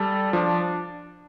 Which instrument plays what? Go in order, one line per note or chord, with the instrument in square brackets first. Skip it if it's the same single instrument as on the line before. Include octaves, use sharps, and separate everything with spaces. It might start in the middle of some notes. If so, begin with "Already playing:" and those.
Already playing: [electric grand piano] G3 [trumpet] A4
[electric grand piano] F3 [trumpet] D4